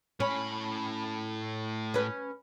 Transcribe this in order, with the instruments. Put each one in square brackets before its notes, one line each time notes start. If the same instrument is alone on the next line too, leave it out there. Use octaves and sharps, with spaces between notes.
[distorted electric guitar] A2 B5 [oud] C#4
[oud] C#4 B4